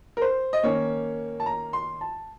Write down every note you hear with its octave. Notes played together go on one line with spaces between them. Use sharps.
A#4
C5
D#5
D#3 A#3 C#4 C#5
A5
A#5
C6
A5